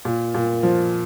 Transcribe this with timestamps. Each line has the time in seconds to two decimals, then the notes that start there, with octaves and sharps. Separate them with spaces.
0.05 A#2
0.34 A#2
0.63 F3